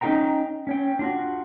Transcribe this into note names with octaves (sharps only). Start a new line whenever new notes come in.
C#4 D#4 F4 A#4 G5 A#5
C#4 C#5 G5
D4 F4 F#4